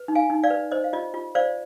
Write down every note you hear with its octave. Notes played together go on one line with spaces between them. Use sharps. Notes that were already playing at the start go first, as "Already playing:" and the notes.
Already playing: B4
D#4
F5 G#5
D#4
D5 F5
B4
C5 D#5
F5
F4 D#5
F4
C5 D5 F5